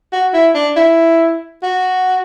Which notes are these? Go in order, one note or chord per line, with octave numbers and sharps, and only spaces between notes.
F#4
E4
D4
E4
F#4